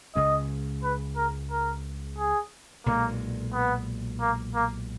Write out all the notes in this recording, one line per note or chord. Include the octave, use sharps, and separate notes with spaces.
C#2 C#3 G#3 C#4 D#5
B4
A#4
A#4
G#4
B1 A#2 G#3 A#3
B3
A#3
A#3